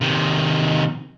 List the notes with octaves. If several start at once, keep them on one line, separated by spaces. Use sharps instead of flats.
C3 D#3